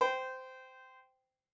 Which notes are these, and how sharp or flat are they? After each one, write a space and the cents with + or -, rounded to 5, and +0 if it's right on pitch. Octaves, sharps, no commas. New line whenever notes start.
C5 -15 G5 -10